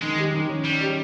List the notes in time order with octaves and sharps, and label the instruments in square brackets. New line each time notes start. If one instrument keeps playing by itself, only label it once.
[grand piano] D#3 [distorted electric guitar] G#3
[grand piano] G4
D#3
C#4
[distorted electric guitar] G3 [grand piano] C#4
[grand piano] G4